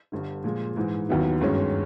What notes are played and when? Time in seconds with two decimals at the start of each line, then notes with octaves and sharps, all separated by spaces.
0.12 G1 G2 D3
0.44 A#2 F3 G#3
0.76 G#2 E3 G#3
1.09 D#2 D#3 F#3 B3 E4
1.41 G1 F#2 D#3 G#3 C#4